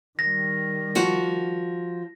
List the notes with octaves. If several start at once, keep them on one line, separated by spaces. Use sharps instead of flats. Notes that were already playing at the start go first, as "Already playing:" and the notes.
D#3 G3 A#6
F3 F#4